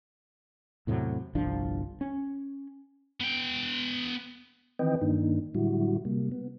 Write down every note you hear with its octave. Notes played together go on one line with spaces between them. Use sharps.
E2 A2 C3 F#3
G1 C2 F3 D4
C#4
B3 G5
D#3 E3 C4 B4 D#5 G5
G2 D#3 A#3 D4 D#4
A2 D3 F#3 G3 E4 F#4
C3 G3 A#3
B3